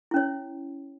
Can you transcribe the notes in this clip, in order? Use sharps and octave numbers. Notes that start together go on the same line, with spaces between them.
C#4 E4 C#5